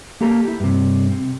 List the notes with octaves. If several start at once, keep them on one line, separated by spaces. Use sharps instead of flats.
A#3 G4 A4 A#4 A#5
E4 G4
G2 C3
C3